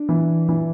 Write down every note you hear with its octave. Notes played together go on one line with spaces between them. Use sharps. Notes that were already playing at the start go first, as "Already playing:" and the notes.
Already playing: D4
E3
E3